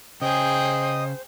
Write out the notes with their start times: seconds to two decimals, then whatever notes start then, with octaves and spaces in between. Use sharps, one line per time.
0.22 C#3 G#4 C5 D#5 G5 D#6